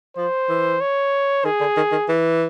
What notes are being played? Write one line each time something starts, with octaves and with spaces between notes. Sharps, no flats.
F3 C5
E3
C#5
D#3 G#4
D3
D#3
D#3
E3